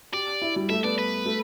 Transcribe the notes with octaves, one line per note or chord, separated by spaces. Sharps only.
G4 D5
E4
G3
A3 E5
B3 D5
B4
A3